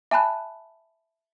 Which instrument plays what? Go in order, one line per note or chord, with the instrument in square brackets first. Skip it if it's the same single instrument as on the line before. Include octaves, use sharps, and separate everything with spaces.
[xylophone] E5 G#5 A5 B5 F#6